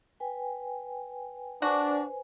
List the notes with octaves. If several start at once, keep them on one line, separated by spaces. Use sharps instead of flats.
B4 G5 G#5
D4 F#4 B4 C5 G#5